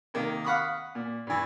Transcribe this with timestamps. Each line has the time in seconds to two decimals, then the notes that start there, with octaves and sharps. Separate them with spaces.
0.14 C3 D#3 A#3
0.44 F5 F#5 B5 C#6 D#6
0.95 A#2
1.27 G2 E3